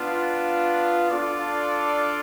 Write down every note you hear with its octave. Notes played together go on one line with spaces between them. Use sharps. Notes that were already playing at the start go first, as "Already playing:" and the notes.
Already playing: B3 D4 F4
D4 F4 A4 D5